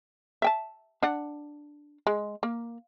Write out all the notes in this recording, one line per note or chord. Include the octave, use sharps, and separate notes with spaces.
E5 G5 A5
D4 F#5
G#3
A#3